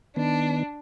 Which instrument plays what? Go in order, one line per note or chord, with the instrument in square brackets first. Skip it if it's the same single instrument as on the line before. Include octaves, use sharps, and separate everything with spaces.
[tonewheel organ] D#3 B3 [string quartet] D4